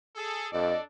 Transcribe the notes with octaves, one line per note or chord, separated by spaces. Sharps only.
G#4 A4
F2 D4 A4 D5 D#5